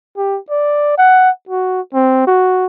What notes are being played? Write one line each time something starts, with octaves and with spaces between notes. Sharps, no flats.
G4
D5
F#5
F#4
C4
F#4